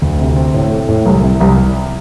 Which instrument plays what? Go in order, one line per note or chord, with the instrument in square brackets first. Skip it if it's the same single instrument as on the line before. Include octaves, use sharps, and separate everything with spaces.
[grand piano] D2
C3
C4
A2
A3
A2
C2
C3
C2